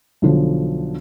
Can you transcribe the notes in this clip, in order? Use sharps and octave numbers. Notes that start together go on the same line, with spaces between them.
B1 D3 F3